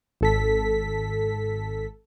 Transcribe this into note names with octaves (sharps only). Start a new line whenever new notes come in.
G#1 A4 B6